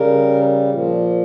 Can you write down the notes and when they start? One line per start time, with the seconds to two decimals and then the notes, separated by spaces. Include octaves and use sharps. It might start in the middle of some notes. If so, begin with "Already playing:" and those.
Already playing: C#3 G3 A#4
0.71 A#2 F3